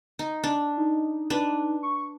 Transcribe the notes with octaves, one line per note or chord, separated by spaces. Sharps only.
D#4
D4
D#4
D4 B4
C#6